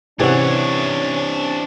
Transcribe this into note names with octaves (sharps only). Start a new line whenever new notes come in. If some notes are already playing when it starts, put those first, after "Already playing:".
C3 E3 C#4 D4 C#5 F#5